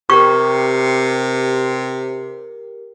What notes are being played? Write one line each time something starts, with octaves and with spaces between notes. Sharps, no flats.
C3 G4 A#4 C#6